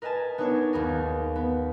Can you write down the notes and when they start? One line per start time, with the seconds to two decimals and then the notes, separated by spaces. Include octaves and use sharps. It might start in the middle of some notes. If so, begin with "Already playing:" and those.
0.02 A#4 B4 D#5 G#5 A5
0.38 B3 D4 D#4 C#5 F#6 G#6
0.73 D#2 B3 G#4 A#4
1.36 B3